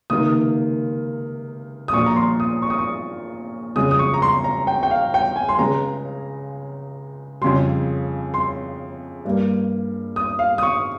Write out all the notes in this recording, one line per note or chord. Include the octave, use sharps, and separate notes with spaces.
C#2 C3 D#3 A#3 D#6
D#6
A#1 A#2 F3 C#6
A#5
C6
D#6
C#6
D#6
C#6
F2 C#3 G#3 D#6
D#6
C#6
A#5
C6
A#5
G5
G5
F5
G5
G#5
C6
C#2 C#3 G#3 A#5
F2 C#3 G3 C6
C6
G2 G3 A#3
D#6
F5
D#6
C#6